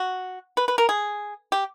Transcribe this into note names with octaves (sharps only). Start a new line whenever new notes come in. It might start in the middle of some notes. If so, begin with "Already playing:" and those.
Already playing: F#4
B4
B4
A#4
G#4
G4